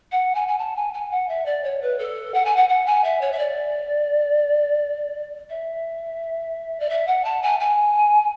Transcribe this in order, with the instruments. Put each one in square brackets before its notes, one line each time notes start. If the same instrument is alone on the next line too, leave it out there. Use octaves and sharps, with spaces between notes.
[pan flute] F#5
G#5
G#5
A5
G#5
G#5
F#5
E5
D5
C#5
B4
A4
F#5
G#5
F#5
F#5
G#5
E5
C#5
E5
D5
E5
D5
E5
F#5
A5
G#5
G#5